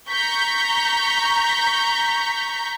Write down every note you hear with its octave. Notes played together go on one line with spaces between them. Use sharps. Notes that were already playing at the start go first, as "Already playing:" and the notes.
A#5 C#6 G6 B6